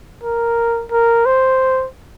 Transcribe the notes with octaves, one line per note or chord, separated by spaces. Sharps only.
A#4
A#4
C5